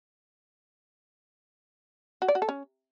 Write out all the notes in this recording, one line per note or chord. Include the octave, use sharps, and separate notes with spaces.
F#4
D5
F#4
A4
C#4